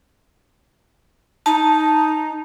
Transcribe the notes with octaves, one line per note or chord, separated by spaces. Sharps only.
D#4 A5